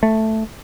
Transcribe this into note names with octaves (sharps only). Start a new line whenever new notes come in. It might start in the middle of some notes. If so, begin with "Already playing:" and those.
A3